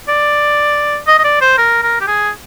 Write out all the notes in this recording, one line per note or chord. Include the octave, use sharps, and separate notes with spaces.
D5
D#5
D#5
D5
C5
A#4
A#4
G4
G#4